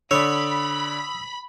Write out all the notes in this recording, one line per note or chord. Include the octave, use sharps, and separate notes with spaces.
D3 C#5 D5 B5 D#6 E6